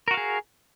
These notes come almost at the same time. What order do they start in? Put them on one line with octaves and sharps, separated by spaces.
A#4 F#4 F5 G#4